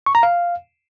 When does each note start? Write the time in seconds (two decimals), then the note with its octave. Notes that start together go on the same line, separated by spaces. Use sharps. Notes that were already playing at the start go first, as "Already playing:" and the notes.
0.06 C#6
0.15 A#5
0.23 F5